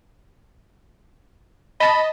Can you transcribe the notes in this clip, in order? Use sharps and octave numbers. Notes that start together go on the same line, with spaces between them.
D#5 A5 B5